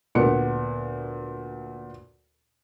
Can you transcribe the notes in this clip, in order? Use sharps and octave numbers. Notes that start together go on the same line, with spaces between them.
D2 A#2 B3 C#7